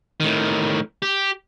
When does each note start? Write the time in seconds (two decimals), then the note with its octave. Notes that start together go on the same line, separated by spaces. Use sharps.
0.20 A2 D#3
1.02 G4